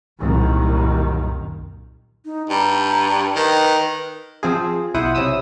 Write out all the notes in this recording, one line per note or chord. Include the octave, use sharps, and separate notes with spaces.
C2 F#2 A#2 D#3
D#4
G2 A#5
D#3 B4
F3 C4 F4 G#4
B1 E4 C5 F#5 D#6
C3 C#4 E4 D#6 E6